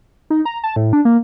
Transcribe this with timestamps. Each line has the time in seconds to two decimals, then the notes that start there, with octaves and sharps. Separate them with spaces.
0.30 D#4
0.45 A#5
0.64 A5
0.76 A2
0.93 D4
1.05 A#3